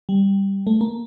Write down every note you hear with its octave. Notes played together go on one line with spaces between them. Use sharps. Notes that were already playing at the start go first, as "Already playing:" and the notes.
G3
A3
A#3